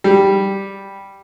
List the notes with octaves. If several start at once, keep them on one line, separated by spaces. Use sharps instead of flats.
G3